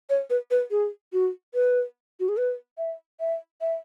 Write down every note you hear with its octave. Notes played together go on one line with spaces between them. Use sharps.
C#5
B4
B4
G#4
F#4
B4
F#4
G#4
B4
E5
E5
E5